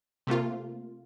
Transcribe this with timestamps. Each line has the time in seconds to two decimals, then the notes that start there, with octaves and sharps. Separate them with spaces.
0.27 C3 A3 A#3 F4